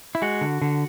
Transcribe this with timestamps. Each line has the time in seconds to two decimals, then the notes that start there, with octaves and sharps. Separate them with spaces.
0.15 E4
0.22 G#3 F#4
0.41 D3
0.62 D3